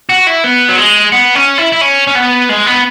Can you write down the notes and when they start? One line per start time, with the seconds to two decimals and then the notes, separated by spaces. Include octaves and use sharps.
0.09 F#4
0.27 E4
0.44 B3
0.69 F#3
0.78 G#3
1.12 B3
1.35 C#4
1.58 E4
1.72 E4
1.81 C#4
2.07 C#4
2.15 B3
2.49 G#3
2.67 B3